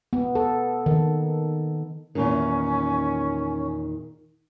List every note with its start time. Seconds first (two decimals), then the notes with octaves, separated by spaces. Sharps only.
0.13 B3
0.35 A4
0.86 D#3
2.15 E2 A#2 D#3 C#4